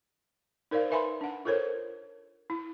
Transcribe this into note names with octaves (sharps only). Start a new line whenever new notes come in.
D#4 A#4 C5 D5 F5
D#4 B4 E5 G#5 B5 C6
D4 F#5
F4 A4 A#4 C5 C#5
E4